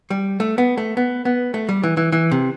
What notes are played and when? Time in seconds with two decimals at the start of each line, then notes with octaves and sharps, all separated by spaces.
0.10 G3
0.40 A3
0.58 B3
0.77 A3
0.97 B3
1.25 B3
1.54 A3
1.69 G3
1.84 E3
1.97 E3
2.12 E3
2.31 C3